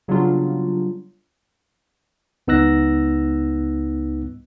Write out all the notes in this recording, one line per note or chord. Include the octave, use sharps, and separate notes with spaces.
C#3 F#3 G3 B3 D4 F4
C#2 B3 D#4 E6 F#6 A#6